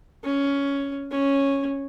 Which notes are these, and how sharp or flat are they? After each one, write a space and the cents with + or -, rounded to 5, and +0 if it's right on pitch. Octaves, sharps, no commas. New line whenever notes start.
C#4 +10
C#4 -5